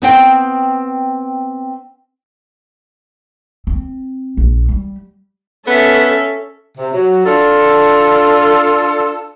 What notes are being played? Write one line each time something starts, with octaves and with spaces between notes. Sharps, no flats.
B3 C4 G5
C4
A#1
G3
B3 C#4 A4 E5
C3
F#3
D4 F4 A4